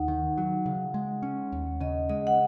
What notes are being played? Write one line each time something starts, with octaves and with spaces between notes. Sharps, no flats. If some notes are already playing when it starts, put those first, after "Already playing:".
Already playing: D#2 D#4 F#5
D#3
F#3
C#3
G#3
C#4
D#2
C#3 D#5
G#3 D#5
F#5